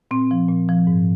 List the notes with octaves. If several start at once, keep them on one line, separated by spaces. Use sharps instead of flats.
A#2 C4
F3
A#2
F3
G#2